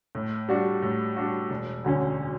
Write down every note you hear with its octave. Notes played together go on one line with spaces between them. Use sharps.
A2
G3 D4 F#4
A2
G3 D4 F#4
E1
D2 D3 F#3 C#4